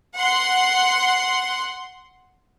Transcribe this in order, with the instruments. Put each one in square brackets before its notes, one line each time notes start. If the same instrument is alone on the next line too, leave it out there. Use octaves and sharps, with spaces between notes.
[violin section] F#5 C6